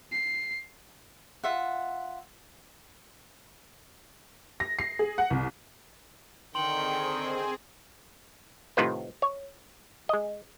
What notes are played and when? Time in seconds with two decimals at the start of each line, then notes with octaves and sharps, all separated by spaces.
0.12 C7
1.44 F4 E5 F#5
4.60 A#6
4.79 C7
4.99 G#4
5.18 F#5
5.30 C2
6.55 D3 D#3 C4 G#4 G5 C6 C#6 F#7
8.77 A2 C3 D#3 F4 B4 C5
9.22 C#5
10.09 G#3 D#5